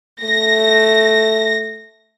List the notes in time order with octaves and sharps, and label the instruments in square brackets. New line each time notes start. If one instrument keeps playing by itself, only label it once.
[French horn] A3 [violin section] A#6